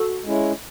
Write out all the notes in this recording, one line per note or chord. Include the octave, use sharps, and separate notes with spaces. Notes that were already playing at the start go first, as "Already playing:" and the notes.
Already playing: F#4 A4
G#3 C#4 E4